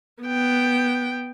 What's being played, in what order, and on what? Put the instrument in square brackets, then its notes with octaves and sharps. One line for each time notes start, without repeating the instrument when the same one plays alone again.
[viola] B3 G5